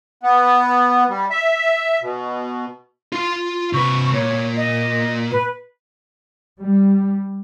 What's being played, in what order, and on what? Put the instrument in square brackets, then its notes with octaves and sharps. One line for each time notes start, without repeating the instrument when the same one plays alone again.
[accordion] B3
G3
E5
B2
[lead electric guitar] F4 C6
[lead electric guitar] C3 B4 [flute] C#6
[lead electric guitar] A#2 [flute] C#5
[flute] D#5
B4
[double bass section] G3